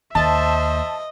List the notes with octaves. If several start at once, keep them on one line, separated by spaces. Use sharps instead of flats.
D#2 C5 D#5 E5 A5